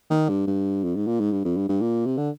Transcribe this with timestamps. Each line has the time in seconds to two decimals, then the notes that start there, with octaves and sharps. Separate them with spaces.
0.10 D#3
0.29 G2
0.47 G2
0.84 F2
0.96 G#2
1.08 A#2
1.20 G#2
1.32 G2
1.45 F2
1.57 G2
1.69 G2
1.81 A#2
2.06 C3
2.18 D3